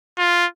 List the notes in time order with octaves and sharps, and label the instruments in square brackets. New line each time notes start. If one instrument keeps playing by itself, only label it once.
[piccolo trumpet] F4